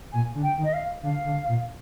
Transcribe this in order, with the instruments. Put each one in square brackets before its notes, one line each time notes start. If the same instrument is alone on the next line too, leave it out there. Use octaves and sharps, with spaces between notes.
[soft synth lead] A#2 [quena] G#5
[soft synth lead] D3
[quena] G5
[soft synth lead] D#3
[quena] D#5
F5
[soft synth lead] D3 [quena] F5
[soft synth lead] D3
A#2